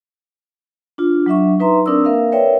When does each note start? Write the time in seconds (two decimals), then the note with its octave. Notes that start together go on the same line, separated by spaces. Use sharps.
0.98 D4 F4
1.26 F#3 D4 E5 C#6
1.60 D#4 B4 E5 A#5 C6
1.86 C4 D4 A#4 D5 D#6 E6
2.05 A#3 A#4 E5 F5
2.32 A#4 B4 C#5 D5 E5 G5